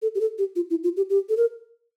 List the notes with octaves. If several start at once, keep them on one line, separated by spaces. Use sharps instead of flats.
A4
G4
A4
G4
F4
E4
F4
G4
G4
A4
A#4